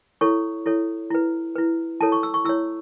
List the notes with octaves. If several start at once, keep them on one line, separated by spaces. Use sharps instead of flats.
E4 A4 C#5 C#6
E4 A4 C#5
E4 B4
E4 B4
E4 A4 C#5 A5
C#6
E6
C#6
E4 C#5 E6